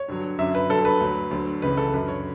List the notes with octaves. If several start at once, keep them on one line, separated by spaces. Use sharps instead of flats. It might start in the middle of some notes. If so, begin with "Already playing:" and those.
Already playing: C#5
G2 D3 F#3
F#2 D3 F#3 E5
B4
G2 D3 F#3 A4
B4
D2 D3 F#3
D2 D3 F#3
C#2 C#3 E3 B4
A4
F#2 D3 F#3 B4
C#5